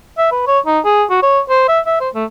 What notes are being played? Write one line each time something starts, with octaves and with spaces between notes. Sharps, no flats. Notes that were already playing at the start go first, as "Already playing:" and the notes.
E5
B4
C#5
D#4
G#4
F#4
C#5
C5
E5
E5
C5
A3